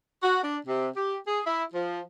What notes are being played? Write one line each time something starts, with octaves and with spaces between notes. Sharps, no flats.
F#4
D4
C3
G4
G#4
E4
F3